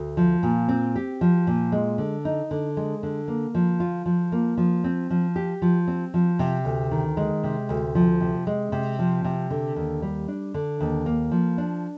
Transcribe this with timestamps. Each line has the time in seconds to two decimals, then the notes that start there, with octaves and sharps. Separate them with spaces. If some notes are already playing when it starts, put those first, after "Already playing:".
Already playing: D2
0.17 F3
0.43 A#2
0.69 C4
0.96 G4
1.21 F3
1.47 A#2
1.72 G#3
1.98 D3
2.25 D#4
2.51 D3
2.77 G#3
3.03 D3
3.28 A#3
3.55 F3
3.80 F4
4.06 F3
4.32 A#3
4.57 F3
4.84 C4
5.10 F3
5.36 G4
5.62 F3
5.88 C4
6.14 F3
6.39 C3
6.65 D2
6.91 D#3
7.17 G#3
7.44 C3
7.69 D2
7.95 F3
8.21 C3
8.47 G#3
8.72 C3
8.99 F3
9.24 C3
9.51 D3
9.76 D#2
10.02 G3
10.28 D4
10.54 D3
10.80 D#2
11.06 A#3
11.31 F3
11.58 D4